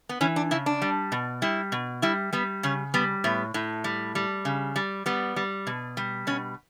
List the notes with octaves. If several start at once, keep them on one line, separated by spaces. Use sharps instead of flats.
B3
E3 C#4
D4
C#3 E4
D4
G3
B2
G3 E4
B2
G3 E4
G3 B3
C#3 C#4
G3 B3
A2 B3
A2
G3
G3
C#3
G3
G3 B3
G3
B2
G3
B2 C#4